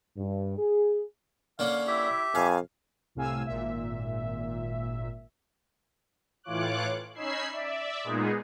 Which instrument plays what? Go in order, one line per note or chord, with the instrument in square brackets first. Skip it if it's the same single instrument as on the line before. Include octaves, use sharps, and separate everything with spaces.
[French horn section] G2
G#4
[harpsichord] D3 A#3 C#4 [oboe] F5
[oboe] E4 [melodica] G4 E5
[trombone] F2 [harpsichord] F5 [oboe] G#5
[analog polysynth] C2 A2 C3 F5 G#5 E6
G#1 A#2 E5
[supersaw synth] A2 E3 F4 C#5 D6 F#6
C#4 D#4 B5 E6 G#6 C7
D5 E5
A#2 G#3 B3 D#4 G#4